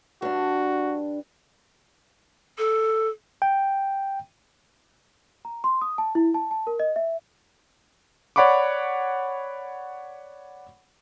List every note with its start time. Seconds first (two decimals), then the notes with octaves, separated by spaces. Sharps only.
0.22 G2 D4 F#4
2.58 A4
3.42 G5
5.45 A#5
5.64 C6
5.81 D#6
5.98 A5
6.15 E4
6.34 A5
6.51 A5
6.67 A#4
6.80 D#5
6.96 E5
8.36 C#5 D5 F#5 B5 C#6 D6